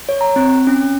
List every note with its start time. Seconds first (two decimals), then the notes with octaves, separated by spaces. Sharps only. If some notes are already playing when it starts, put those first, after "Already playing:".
0.09 C#5
0.21 A#5
0.36 C4
0.67 C#4